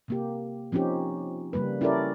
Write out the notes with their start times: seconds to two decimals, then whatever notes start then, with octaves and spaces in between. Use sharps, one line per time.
0.08 C3 A#3 G4
0.72 F3 C4 C#4 D#4 G4
1.53 C#3 G3 A#3 B4
1.81 C#4 E4 G4 A4 A#4 D5